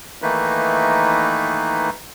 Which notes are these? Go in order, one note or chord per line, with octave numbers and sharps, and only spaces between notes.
D#3 E3 A3 A#3 D#4 B4